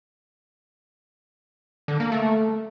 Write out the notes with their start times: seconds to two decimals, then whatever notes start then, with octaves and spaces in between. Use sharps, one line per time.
1.88 D3
2.00 A#3
2.12 A3